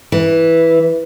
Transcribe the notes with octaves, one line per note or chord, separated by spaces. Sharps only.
E3